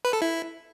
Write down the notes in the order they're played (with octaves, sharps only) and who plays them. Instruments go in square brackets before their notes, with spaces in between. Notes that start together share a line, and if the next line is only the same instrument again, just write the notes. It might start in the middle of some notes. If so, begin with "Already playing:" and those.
[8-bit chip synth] B4
A4
E4